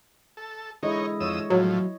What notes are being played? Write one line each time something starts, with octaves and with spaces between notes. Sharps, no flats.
A4
D3 G#3 D#4 E4 C#5 D#5
F2 C#5 D#6 E6
A2 F3 F#3